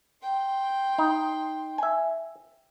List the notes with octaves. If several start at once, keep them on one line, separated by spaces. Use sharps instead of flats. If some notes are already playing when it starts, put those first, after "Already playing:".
G5 C6
D#4
E5 G#5